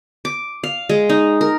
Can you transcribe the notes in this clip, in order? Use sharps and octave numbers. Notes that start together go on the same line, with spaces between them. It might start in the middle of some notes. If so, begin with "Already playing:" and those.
D6
F5
G#3
D#4
A#4